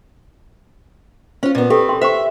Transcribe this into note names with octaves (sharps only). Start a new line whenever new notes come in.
C#4 F4 C5
A#2 B3
C4 G4 A4 B4 G5
A#4 G5 C6
C5 E5 G5 C#6